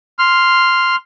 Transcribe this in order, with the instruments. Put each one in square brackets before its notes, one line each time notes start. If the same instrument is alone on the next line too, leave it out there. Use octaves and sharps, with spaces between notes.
[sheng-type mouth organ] C6 F6